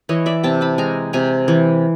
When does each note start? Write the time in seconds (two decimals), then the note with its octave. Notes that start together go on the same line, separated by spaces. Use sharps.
0.09 E3 C#5 D#5
0.26 D5 E5
0.43 C3 G5 A5
0.61 A5 B5
0.78 G#3 G#5 A#5
1.13 C3 G#5 A#5
1.48 E3